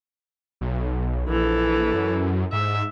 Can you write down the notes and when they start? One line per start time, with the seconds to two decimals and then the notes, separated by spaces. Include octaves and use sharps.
0.61 B1
1.28 A#1 E3 A4
1.94 F#2
2.52 G#2 E5